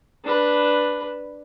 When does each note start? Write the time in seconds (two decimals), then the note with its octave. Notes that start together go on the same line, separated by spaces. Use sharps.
0.24 D4 B4